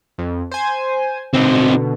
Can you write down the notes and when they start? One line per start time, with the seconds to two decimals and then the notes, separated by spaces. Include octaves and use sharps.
0.18 F2
0.51 C5 G#5
1.34 B2 D3 C4 D#4